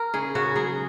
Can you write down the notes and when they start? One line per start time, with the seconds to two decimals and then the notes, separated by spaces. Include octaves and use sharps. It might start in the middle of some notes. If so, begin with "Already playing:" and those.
Already playing: A#4
0.14 C#3 G#4
0.35 C#3 F#4
0.56 F#3 G#4